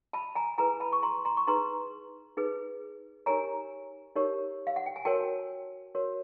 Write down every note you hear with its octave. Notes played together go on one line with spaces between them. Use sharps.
A5 B5
G#5 A#5
E4 G#4 B4 G#5 A#5
A5 B5
C#6
A#5 C6
A#5 C6
C#6
D#4 G#4 B4 A#5 C6
D#4 G#4 B4
D#4 G4 A#4 C#5 G#5 A#5
D#4 G4 A#4 C#5
F5
F#5
G5
G#5
F#4 A#4 C#5 G5 A5
F#4 A#4 C#5